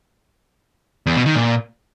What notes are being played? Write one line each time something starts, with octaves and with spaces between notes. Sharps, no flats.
E2
B2
D#3
A#2